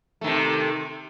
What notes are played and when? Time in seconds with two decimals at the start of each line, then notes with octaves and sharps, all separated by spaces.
0.21 A3
0.24 D#3
0.27 C3